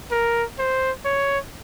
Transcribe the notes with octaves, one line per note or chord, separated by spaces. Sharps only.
A#4
C5
C#5